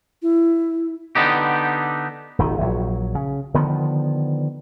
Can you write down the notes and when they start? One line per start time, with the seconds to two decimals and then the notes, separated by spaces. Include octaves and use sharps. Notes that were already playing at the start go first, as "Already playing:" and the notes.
0.22 E4
1.15 D3 B3 D#4 G4
2.38 D#1 G#1 D#3
2.61 A#1 F#3
3.15 C#3
3.54 D3 D#3 F3 B3